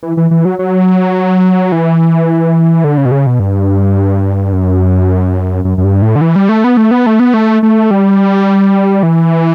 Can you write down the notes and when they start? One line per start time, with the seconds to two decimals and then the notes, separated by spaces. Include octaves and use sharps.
0.03 E3
0.17 E3
0.31 E3
0.45 F#3
0.59 F#3
1.72 E3
2.84 D3
2.98 C#3
3.05 B2
3.12 C#3
3.27 B2
3.40 G2
4.53 F#2
5.65 F#2
5.78 F#2
5.84 G2
6.02 A2
6.16 D3
6.21 E3
6.36 G3
6.49 A3
6.64 B3
6.77 A3
6.91 B3
7.06 A3
7.20 B3
7.34 A3
7.63 A3
7.91 G3
9.03 E3